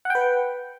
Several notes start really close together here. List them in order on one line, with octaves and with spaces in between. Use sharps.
F#5 G5 B4